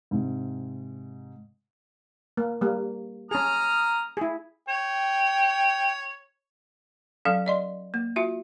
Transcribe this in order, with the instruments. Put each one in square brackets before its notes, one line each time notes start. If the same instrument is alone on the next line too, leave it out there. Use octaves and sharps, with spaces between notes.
[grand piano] G#2 C3
[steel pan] A#3
G3 A#3
[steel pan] C#4 G#4 [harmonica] A#5 D#6 F6
[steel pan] E4 G#4
[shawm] C#5 [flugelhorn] G5
[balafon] F#3 C#4 A4 F5
D5 D#5 C6
A#3
F4 F#4 E5